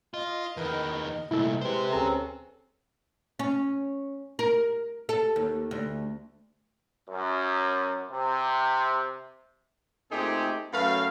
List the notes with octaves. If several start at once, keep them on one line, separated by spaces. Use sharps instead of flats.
F4 D#5
E2 D#3 A#4 B4
D#5
C2 A#2 A3 E4 A4
C3 G#3 G4 B4 C5
D2 C4 C#4 G#4 A4 A#5
C#4
A#4
A4
D#2
D2
F#2
C3
A#2 A3 C4 D#4 G4 G#4
F#2 F#3 A3 B4 F5